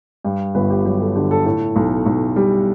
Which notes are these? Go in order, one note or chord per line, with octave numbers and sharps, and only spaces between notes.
G2 G4
G1 B4
G4
F#3 G4
A4
D3 G4
A4
A2 A4
B1
B1
G3